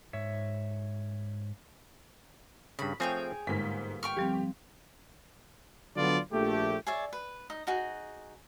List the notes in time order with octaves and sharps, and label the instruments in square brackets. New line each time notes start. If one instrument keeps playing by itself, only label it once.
[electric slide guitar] G#2 C#5 E5
[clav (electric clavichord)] G2 C#3 [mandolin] B5
[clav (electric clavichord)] F3 A3 C4 [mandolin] G#4 C#5 G5
[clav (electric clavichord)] G1 A#3 [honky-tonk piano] G#2 B6
[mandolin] G5 C#6 F6
[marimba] F3 G3 C4 [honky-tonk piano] G4
[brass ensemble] D3 F#3 B3 D4 F4 D5
A#1 A3 G4
[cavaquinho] G#4 C#5 D5 E5
B4
D#4 D#6
D#4 F#4 G#4